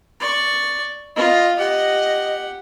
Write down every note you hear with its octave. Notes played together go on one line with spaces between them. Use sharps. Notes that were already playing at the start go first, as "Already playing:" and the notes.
D5 C#6
F4 D#5
G4 D#5 F#5